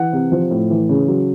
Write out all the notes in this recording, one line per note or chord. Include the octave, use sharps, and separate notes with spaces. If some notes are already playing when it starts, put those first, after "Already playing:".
Already playing: E3 F#5
C3
F3
A2
E3
C#3
F#3